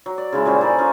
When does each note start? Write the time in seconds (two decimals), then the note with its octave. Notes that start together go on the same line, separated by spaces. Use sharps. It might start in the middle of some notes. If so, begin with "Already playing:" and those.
0.06 F#3
0.18 D5
0.32 C#3 G#3 E4
0.46 A#2 G3 C#4 C5
0.61 D#4 G#4 A4 D5
0.78 C#4 D#4 F4